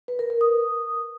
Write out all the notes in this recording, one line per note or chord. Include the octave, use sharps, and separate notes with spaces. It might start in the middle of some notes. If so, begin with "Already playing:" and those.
B4
A#4
A#4
D#6